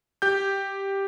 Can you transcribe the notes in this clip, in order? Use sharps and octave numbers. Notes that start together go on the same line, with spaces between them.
G4 G6